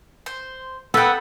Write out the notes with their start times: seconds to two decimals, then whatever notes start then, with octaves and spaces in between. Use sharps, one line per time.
0.26 C5
0.94 B3 A4 G5 E6 F#6